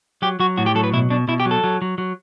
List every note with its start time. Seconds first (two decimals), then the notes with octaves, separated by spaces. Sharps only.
0.22 F#3 G4
0.40 F#3 F#4
0.57 A2 F#4
0.66 G4
0.75 F#3 A4
0.84 B4
0.93 B2 E4
1.10 B2 D4
1.28 B2 E4
1.40 G4
1.45 F#3
1.51 A4
1.64 F#3
1.82 F#3
1.98 F#3